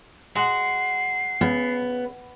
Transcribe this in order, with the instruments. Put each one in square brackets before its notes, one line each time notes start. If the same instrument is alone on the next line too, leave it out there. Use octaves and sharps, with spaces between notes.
[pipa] G#3 [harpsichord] F#4 F#5 [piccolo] C7
[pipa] C#3 [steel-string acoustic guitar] B3